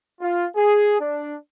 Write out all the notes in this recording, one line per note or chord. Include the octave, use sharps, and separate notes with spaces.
F4
G#4
D4